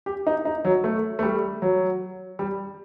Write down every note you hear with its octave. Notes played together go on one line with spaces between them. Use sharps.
G4
D#4
D#4
F#3
A3
A3
G3
F#3
G3